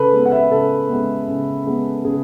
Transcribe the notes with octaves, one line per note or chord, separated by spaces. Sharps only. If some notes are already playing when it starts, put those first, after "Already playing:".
Already playing: C#3 A4 B4
G#3 B3
F#5
E5
C#3 A4
G#3 B3
C#3
G#3 B3
C#3 G#4